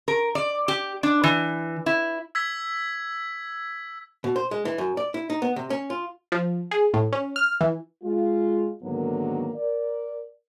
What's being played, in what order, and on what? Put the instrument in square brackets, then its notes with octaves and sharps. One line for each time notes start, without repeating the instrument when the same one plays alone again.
[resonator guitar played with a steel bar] A#4
D5
G4
D4
E3
E4
[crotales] E6 G#6 B6
[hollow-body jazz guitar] B2
C5
G#3
E3
F#2
D5
E4
D#4
B3
C3
C#4
F4
[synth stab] F3
G#4
A2
C#4
F6
E3
[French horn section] G#3 F4
G#2 D3 D#3 F#3 A#3 B3
A#4 D5